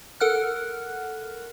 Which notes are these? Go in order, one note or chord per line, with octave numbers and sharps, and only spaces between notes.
A4 A#4 F#5 F6 F#6